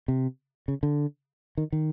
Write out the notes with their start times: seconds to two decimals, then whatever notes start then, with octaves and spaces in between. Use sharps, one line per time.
0.08 C3
0.68 C#3
0.83 D3
1.57 D#3
1.72 D#3